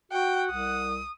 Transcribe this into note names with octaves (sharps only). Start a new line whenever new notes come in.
F#4 F#5 G5
C2 D#6